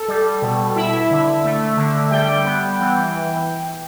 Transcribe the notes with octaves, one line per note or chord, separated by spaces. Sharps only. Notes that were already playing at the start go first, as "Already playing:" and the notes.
Already playing: A4
G3
B2
E4 E5
D3
A3
D3
G3 G5
B3
E3